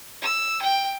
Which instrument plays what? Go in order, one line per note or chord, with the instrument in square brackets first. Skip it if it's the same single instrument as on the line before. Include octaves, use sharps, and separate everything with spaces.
[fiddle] E6
G5